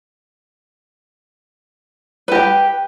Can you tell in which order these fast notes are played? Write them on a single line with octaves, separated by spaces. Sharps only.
B4 G4 G5